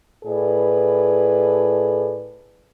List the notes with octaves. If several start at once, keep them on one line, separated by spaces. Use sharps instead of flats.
A2 G#4 A4 B4 D5